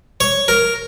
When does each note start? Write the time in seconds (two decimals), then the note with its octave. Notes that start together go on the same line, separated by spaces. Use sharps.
0.20 C#5
0.48 A#4